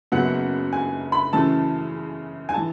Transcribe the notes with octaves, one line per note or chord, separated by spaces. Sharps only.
F#1 F#2 C#3 F#3 B3 F#5
G#5
B5
F#2 C#3 E3 A3 A5
G#5
E3 A5